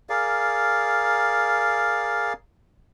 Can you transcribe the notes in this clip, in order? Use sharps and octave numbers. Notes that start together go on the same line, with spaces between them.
G#4 A#4 D5 F5